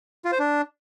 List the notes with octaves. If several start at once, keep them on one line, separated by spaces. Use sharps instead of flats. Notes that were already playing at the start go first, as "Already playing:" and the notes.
F4
C5
D4